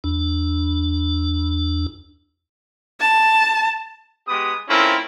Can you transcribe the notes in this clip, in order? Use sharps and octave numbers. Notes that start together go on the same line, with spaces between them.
E2 D4
A5
G#3 B3 G4 D#6
A3 C4 C#4 E4 F4 A#4